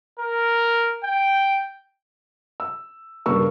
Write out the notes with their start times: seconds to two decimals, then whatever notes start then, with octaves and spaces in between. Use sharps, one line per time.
0.19 A#4
1.04 G5
2.60 E6
3.26 G2 C#3 A#3 A#4 C#6 E6